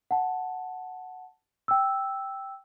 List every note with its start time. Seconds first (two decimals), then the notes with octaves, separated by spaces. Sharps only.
0.11 F#5 A5
1.68 G5 E6